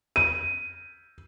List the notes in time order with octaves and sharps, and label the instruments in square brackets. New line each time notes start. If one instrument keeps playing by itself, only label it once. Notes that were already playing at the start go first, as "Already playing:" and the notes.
[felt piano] D#7